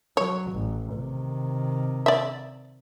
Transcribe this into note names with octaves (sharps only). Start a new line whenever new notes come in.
F#3 C#5
A1
C3 D#3
D5 E5